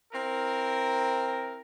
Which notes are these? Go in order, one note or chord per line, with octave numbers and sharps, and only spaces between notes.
C4 E4 A#4